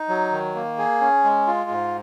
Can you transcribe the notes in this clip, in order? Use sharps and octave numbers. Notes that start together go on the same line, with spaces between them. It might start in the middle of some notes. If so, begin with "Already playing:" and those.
Already playing: D#4
F#3
D#3
A#3
G#4
C#4
G#3
F4
G#2